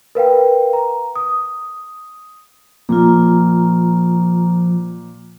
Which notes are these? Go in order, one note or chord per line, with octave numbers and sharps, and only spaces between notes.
A#4 B4 F5 G5
A#5
D#6
A#2 F3 F4 A#5